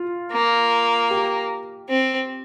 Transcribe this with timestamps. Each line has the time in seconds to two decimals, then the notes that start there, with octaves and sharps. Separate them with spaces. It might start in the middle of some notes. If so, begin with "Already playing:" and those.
Already playing: F4
0.32 A#3
1.11 G4
1.89 C4